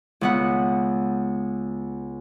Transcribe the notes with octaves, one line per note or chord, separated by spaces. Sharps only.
C#2 B3 F#5